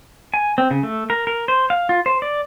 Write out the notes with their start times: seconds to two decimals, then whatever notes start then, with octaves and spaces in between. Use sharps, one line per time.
0.34 G#5
0.58 C4
0.71 C#3
0.83 A3
1.10 A#4
1.27 A#4
1.48 C5
1.70 F5
1.89 F4
2.06 C5
2.22 D5